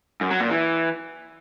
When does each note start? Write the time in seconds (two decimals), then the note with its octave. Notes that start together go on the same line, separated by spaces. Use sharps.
0.21 F#2
0.31 F#3
0.40 A#2
0.50 E3